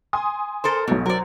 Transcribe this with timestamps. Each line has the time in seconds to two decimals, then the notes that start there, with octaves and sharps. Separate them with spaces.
0.13 G#5 C6 D#6
0.64 A4 A#4 C5
0.87 B1 G#2 B2
1.06 F#3 A#4 C5 D5